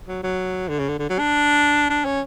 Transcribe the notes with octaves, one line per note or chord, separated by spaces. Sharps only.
F#3
F#3
D3
C#3
D3
D3
F#3
D4
D4
C#4